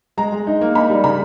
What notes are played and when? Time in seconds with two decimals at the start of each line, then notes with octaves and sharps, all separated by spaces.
0.17 G#3 A#5
0.32 G#3
0.47 D#4
0.61 A#3
0.75 D#4 B5
0.90 G3
1.04 C#3 B5